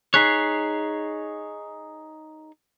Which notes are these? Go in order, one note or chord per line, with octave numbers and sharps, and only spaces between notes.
D#4 G#4 C#5 F#6 B6 C7